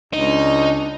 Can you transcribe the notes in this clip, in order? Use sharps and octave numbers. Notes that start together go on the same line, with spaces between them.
C#2 D4 D#4